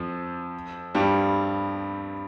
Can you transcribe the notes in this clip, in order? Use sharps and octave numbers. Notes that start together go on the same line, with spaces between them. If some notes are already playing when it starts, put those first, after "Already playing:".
Already playing: F2 F3
G2 G3